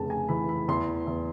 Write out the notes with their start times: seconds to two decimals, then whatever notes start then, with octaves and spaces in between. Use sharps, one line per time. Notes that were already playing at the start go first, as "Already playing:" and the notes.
Already playing: F1 C#3 A5
0.10 G#5
0.29 E3 B5
0.49 B5
0.68 E2 C6
1.07 E2